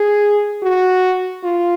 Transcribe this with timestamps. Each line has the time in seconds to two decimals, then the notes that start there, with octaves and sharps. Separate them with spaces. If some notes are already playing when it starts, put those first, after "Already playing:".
Already playing: G#4
0.62 F#4
1.44 F4